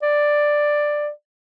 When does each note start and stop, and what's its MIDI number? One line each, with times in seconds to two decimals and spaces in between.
0.02 1.10 74